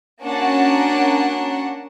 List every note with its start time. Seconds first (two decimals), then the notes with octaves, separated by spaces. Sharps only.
0.24 A#3 C#4 D4 F#4 F#5 A5